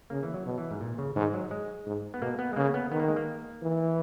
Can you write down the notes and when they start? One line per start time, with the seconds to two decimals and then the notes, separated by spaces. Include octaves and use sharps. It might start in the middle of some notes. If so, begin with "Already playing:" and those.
0.10 C#3 A#3
0.23 E3
0.34 F#3
0.46 B2
0.58 E3
0.71 G#2
0.81 A#2
0.98 C#3
1.15 G#2 D#3
1.34 F#3
1.51 G#3
1.86 G#2
2.14 B3
2.22 B2 A#3
2.39 B3
2.53 G#3
2.56 C#3 A#3
2.74 B3
2.92 D#3 B3
3.00 A#3
3.08 G#3
3.16 A#3
3.62 E3